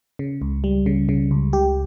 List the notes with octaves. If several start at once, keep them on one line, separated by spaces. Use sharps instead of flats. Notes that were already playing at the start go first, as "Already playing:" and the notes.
C#3
C#2
G3
C#3
C#3
C#2
G4